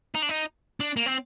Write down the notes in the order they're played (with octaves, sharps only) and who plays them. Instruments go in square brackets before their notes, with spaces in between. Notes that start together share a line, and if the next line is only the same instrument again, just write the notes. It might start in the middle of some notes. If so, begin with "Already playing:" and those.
[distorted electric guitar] D#4
D4
D#4
D4
A#3
C4